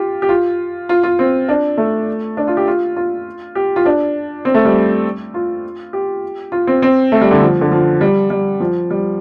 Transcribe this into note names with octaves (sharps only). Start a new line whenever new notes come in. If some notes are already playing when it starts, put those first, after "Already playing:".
Already playing: F4 G4
G4
F4
F4
F4
C4
D4
A3
D4
F4
G4
F4
F4
G4
F4
D4
C4
A3
G3
F4
G4
F4
C4
C4
A3
G3
D3
F3
D3
F3
G3
G3
F3
G3